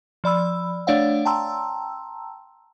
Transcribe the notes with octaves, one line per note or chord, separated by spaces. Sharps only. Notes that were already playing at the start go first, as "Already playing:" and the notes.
F3 D5 B5 E6
A3 D4 C#5 D5 F5 F#5
G5 A5 A#5 C6 E6